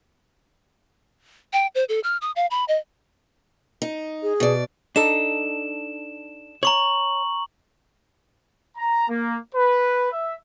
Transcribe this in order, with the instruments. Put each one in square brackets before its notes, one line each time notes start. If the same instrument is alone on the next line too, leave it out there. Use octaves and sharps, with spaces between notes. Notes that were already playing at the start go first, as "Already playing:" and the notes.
[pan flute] G5
C5
A4
F6
D#6
F5
B5
D#5
[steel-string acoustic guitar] D#4
[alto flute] G#4
[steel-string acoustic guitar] B2 D5
[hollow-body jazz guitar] D4 D#4 A4 [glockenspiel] E7
[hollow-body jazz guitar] C#5 [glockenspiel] A#5 C#6 F#7
[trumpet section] A#5
A#3
B4
E5